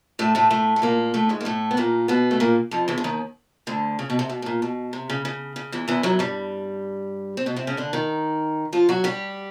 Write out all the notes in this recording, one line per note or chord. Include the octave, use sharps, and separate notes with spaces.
A2 A3
A2 A3
A2 A3
A3
A#2 A#3
A2 A3
G#2 G#3
A#3
A2 A3
B3
A#2 A#3
B2 B3
A3
A#2 A#3
F2 F3
E2 E3
D3
D#2 D#3
D2 D3
C#3
B2
C3
B2
B2
A#2
B2
C3
C#3
C#3
C#3
E2 E3
E2 E3
F#2 F#3
G2 G3
C4
B2 B3
C3 C4
C#3 C#4
D3 D4
D#3 D#4
F3 F4
F#3 F#4
G3 G4